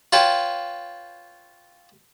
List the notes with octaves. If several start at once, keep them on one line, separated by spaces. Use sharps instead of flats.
F4 B4 C#5 G5 A5